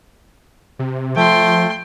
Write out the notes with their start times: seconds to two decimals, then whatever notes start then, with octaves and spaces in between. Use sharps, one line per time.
0.79 C3
1.16 F3 A3 G5 C6